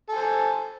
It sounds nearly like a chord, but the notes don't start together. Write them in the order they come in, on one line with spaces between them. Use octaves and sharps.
A4 G#5 C5